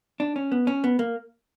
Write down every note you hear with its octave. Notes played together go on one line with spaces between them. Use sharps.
D4
C#4
B3
C#4
B3
A#3